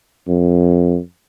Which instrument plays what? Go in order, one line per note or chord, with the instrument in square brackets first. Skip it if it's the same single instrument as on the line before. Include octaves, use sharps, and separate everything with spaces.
[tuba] F2